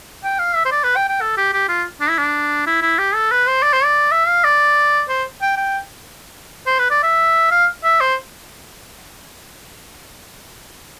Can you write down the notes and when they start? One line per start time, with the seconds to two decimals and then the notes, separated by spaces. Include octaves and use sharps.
0.24 G5
0.39 F5
0.56 E5
0.65 C5
0.72 D5
0.84 B4
0.96 G5
1.09 G5
1.21 A4
1.37 G4
1.53 G4
1.69 F4
2.01 D4
2.09 E4
2.18 D4
2.67 E4
2.82 E4
2.99 G4
3.15 A4
3.31 B4
3.47 C5
3.63 D5
3.73 C5
3.85 D5
4.12 E5
4.28 F5
4.44 D5
5.09 C5
5.42 G5
5.57 G5
6.67 C5
6.79 B4
6.90 D5
7.03 E5
7.51 F5
7.84 E5
8.01 C5